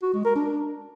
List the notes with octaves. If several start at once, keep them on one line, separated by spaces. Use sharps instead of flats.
F#4
G#3
A#4
D4